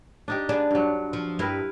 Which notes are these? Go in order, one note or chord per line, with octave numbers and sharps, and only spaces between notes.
D4 D#4 G4
B3 D4 G#4
G2 F#3
F3
G2 E4 A#4 B4